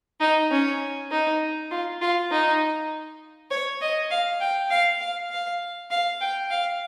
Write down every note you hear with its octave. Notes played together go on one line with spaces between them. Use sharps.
D#4
C#4
D#4
F4
F4
D#4
C#5
D#5
F5
G5
F5
F5
F5
F5
G5
F5